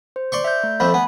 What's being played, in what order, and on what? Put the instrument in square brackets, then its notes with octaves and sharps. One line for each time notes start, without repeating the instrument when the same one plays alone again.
[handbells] C5
[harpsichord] D5 C6 C#6
[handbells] E5 G6
A3
[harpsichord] F2 F3 A3 [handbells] B5
[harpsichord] B3 [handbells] G#5